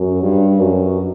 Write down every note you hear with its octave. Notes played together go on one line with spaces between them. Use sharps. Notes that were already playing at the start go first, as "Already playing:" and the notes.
Already playing: F#2
G2
F#2